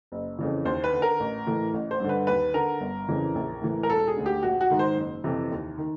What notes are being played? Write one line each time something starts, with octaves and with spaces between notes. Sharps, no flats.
F#1
F2 C#3 E3
D#2 C5
B4
D3
A#4
A1
A2 E3
A1
C5
G2 D3
B4
D#2 B4
D3 A#4
G1
F2 C#3 E3
A#1
A2 E3
A#4
E1 A4
G#4
D2 D3
G4
A#1 F#4
F#4
G#2 D#3
C5
F#1
F2 C3 E3
D#2
D#3